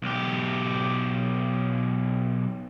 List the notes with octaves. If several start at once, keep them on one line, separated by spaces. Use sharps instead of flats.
B1 G4